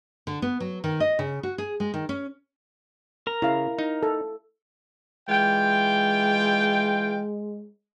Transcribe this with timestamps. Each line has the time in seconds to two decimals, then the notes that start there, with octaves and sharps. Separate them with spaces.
0.27 D3
0.42 B3
0.60 F#3
0.84 D#3
1.00 D#5
1.19 C#3
1.43 F#4
1.58 G#4
1.80 G#3
1.94 D#3
2.09 C#4
3.27 A#4 A#5
3.42 C#3 E4 F5
3.79 D#4
4.03 A4
5.29 E3 G#3 F4 G5